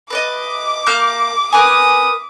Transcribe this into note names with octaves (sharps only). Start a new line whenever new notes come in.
B4 D5 D#5 D6
A#3 F6 G6
A#4 B4 G#5 D#6